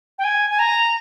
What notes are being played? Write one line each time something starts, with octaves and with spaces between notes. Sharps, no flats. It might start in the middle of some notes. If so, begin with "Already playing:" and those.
G5
G#5
G#5
A#5